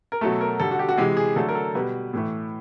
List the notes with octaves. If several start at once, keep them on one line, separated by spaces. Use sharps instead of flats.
A#4
B2 F#3 A3 A4
A#4
D3 G3 A4
F#4
G4
F#4
C3 E3 G#3 G4
G#4
D3 F#3 A3 A4
A#4
A4
B2 G3 B4
A2 E3 A3